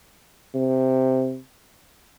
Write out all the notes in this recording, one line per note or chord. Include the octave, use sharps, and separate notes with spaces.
C3